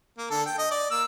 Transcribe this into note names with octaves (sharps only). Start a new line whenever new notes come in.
A#3
D3 A4
G5
D#5
D5
A#3 E6